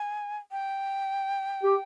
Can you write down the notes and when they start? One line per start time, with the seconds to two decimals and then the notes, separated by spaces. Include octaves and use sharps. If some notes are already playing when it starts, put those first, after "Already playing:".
Already playing: G#5
0.52 G5
1.63 G4